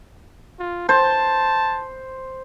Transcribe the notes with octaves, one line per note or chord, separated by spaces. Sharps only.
F4
C5 A5